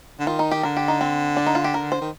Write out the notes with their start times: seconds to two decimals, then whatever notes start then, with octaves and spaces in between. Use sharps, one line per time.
0.20 D3
0.27 D#3 F4
0.39 D#4
0.51 G4
0.63 D3 A#4
0.77 G4
0.88 D#4
1.01 C4
1.37 D4
1.47 D#4
1.55 F4
1.64 G4
1.74 A#4
1.92 C5
2.01 D#3